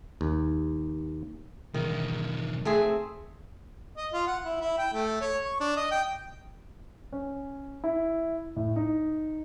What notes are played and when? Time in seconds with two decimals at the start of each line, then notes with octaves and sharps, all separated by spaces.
0.21 D#2
1.74 B1 E2 D#3
2.65 A3 C4 G#4
3.97 D#5
4.13 F4
4.27 F#5
4.45 E4
4.61 E4
4.78 G5
4.93 A3
5.21 C#5
5.43 C#6
5.60 D4
5.77 D#5
5.91 G5
7.13 C#4
7.84 E4
8.56 A2
8.76 D#4